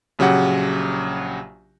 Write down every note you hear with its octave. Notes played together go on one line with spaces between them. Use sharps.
A#1 C#3 F#3 G4 F#5